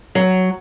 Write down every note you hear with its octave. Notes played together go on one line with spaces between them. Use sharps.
F#3